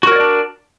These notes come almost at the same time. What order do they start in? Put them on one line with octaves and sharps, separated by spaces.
F#4 A#4 C#5 D5 D4